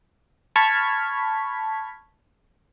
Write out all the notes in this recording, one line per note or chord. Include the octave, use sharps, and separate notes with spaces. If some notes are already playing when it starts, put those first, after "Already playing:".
A5 B5 C#6 F6 G#6 B6